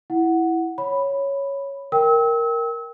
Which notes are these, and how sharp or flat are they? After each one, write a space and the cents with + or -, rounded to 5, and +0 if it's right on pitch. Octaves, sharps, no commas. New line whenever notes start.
E4 +0 F#5 +0
C#5 +0 B5 +0
A#4 +0 G5 +0 E6 -35